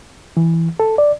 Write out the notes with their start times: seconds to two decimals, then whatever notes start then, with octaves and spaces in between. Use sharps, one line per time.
0.37 E3
0.80 A4
0.98 D5